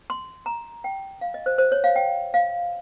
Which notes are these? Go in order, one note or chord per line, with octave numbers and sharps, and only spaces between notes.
C6
A#5
G5
F5
D#5
C5
C5
C#5
F5
G5
F5